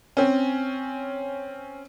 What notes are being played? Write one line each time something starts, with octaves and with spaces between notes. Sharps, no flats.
C4 C#4